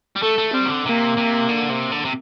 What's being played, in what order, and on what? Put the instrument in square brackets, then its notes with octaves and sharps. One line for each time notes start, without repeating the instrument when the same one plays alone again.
[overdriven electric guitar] G3
[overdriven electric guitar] A3 [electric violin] A4
[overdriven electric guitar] A3
[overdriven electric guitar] G3 [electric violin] C4
[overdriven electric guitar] D#3
D3
[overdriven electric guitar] C3 [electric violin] A#3
[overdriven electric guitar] C3
D3
C3
D3
C3